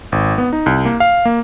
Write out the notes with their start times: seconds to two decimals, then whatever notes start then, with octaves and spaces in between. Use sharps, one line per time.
0.12 G#1
0.38 B3
0.53 D#4
0.66 C2
0.85 A#3
1.00 F5
1.25 A#3